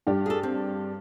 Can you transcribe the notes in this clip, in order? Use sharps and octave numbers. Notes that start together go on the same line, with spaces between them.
G2 D4 G4
G#4 A4
C4